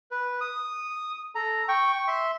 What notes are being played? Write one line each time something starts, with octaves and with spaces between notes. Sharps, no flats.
B4
D#6
A4 A#5
G5 C#6
C#6
E5 C6